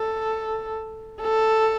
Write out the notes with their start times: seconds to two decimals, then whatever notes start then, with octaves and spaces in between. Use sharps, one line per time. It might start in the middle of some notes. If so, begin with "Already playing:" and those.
Already playing: A4
1.22 A4